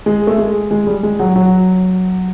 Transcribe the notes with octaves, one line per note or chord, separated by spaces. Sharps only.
G#3
A3
G#3
G#3
G3
G#3
F#3
F#3